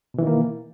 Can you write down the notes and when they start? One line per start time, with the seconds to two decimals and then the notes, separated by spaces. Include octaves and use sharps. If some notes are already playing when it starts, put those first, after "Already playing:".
0.14 B2
0.18 E3
0.23 D#3
0.27 A#3